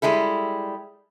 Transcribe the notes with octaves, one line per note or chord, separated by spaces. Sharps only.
G3 G#3 E4 A4